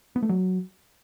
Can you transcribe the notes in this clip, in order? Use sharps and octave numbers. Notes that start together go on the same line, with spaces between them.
B3
A3
F#3